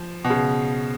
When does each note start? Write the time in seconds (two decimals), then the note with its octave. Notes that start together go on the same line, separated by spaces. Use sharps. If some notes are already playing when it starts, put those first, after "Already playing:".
Already playing: F3
0.24 B2
0.30 C#3